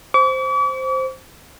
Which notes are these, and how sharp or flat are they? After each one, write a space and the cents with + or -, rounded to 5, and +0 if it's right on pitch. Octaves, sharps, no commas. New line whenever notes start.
C5 +0 D6 -45